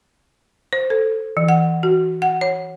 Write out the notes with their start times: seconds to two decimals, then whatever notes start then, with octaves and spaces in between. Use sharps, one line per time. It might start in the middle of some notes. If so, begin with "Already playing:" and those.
0.73 C5
0.90 A4
1.37 E3
1.49 F#5
1.83 F#4
2.22 F#5
2.41 C#5